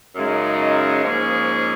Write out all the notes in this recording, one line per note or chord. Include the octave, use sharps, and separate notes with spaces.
F#2 C#3 G#3 D#4
G#2 F3 A#3 C#4 G#4